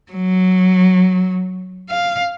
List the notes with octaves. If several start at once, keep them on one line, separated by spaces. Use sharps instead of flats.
F#3
F5